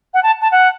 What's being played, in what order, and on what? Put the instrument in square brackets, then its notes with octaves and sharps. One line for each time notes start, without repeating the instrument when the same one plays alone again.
[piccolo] F#5
A5
A5
F#5